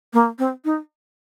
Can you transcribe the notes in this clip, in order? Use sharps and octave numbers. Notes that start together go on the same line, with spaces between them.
A#3
C4
D#4